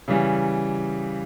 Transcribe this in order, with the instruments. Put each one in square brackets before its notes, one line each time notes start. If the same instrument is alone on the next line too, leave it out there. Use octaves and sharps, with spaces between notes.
[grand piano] C#3 E3 G3